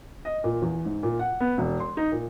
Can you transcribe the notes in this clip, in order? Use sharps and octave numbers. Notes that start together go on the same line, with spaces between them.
D#5
A#2
E2
G#2
A#2
F#5
B3
E1
C6
D#4
A#2